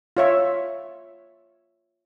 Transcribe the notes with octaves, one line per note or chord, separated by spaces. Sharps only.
F4 C#5 E5